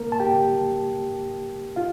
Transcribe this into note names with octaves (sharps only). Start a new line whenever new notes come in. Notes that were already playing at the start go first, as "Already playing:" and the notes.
Already playing: A#3 A#4
A5
G4 G5
F4 F5